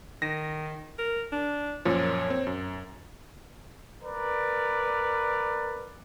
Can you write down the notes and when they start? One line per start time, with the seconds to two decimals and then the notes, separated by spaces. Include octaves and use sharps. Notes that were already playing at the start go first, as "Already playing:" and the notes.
0.22 D#3 A#6
0.99 A#4
1.32 D4
1.85 F#2 A#2 F3 C#5
2.30 C4
2.47 F#2
4.02 A#4 B4 D5